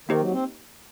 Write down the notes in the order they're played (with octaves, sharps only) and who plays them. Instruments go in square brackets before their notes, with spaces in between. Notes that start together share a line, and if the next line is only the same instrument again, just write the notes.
[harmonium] D#3 [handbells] A#3 D#4 G4 C5 D#5
[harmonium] F#3
C4